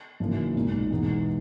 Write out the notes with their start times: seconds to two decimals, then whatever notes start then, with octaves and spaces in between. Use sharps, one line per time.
0.20 F#1 F#2 E3 A#3 D#4
0.55 B1 A#2 G#3 D#4
0.91 E2 B2 G#3 B3 D#4